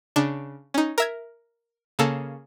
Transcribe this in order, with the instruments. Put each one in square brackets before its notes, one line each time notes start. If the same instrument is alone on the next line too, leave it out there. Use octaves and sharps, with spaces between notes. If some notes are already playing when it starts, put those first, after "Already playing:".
[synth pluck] C#3 D4
C#4 D#4
A#4 E5 G#6
C#3 A#3 A4